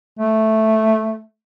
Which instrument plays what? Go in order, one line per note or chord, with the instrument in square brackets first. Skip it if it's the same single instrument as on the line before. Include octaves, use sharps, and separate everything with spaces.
[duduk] A3